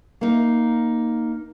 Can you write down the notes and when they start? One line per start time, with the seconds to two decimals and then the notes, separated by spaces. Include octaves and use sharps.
0.21 A#3 D#4